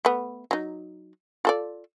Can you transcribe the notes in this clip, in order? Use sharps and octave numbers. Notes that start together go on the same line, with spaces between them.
A3 B3
F#3 D#4
F4 A4 D5